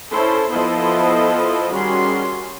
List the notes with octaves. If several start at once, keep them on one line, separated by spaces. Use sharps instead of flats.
C#4 E4 A4 C5
F3 B3 E4 A4 C5 D#5
D#3 G3 C#4 F#4 G#4 C6